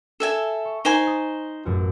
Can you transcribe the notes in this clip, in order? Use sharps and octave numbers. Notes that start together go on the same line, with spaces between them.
A4 E5 G#5
C#6
D#4 C5 G#5
D#6 A6
A1 F#2 F#4